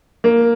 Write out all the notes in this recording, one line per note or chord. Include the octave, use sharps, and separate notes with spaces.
A#3